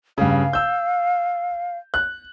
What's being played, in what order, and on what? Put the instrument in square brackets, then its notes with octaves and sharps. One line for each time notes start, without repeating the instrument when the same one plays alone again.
[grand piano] G2 C#3 [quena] F5
[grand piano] E6 G6
F#6